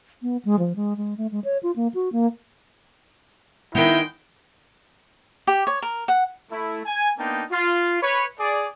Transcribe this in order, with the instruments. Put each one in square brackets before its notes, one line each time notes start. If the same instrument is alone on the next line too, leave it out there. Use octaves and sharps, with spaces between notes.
[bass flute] B3
G#3
F3
G#3
G#3
A3
G#3
C#5
F4
A#3
F#4
A#3
[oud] D#3 B3 [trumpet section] G#3 G5 [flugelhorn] E4
[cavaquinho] G4
C#5
A#4
F#5
[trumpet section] A3 E4
G#5
A#3 B3 D4 D#4 G5 A5
F4
B4 C#5
G#4 D5